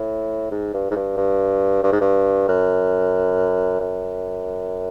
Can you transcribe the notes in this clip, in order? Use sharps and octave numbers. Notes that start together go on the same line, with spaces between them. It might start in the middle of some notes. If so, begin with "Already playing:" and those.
Already playing: A2
G#2
G2
G#2
G2
G2
G2
G#2
G2
F#2
F#2